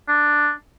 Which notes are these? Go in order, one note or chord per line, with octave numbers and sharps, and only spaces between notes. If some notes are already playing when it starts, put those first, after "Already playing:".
D4